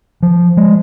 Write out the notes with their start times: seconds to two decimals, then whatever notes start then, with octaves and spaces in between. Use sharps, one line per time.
0.23 F3
0.57 G#3